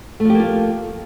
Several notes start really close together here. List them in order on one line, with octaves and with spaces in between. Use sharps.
A3 F3 G4 A#3 F4